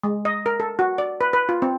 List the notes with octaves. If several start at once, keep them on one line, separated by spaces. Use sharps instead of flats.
G#3
D#5
A#4
A4
F#4
D5
B4
B4
F4
C4